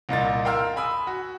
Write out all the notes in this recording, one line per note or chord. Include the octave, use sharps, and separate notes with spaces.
C2 A#2 D#5 A6
A#4 F5 G5 C6 E6 F6
G#5 B5 D#6 E6
F#4